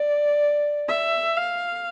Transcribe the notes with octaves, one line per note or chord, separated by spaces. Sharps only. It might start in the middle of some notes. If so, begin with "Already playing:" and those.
Already playing: D5
E5
F5